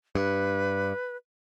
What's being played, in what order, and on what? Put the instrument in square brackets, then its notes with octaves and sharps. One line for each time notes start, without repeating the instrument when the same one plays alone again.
[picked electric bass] G2 [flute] B4